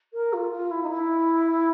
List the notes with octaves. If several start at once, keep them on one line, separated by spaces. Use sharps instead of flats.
A#4
F4
F4
E4
D#4
E4